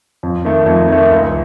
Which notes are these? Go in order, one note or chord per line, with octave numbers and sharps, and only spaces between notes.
F2
D#3 A3
F2
D#3 A3
C#2